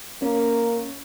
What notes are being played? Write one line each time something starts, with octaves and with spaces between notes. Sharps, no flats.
A#3 C#4